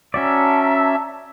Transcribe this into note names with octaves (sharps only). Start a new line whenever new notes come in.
C#4 F#4 D5 E5 A5 A#5 E6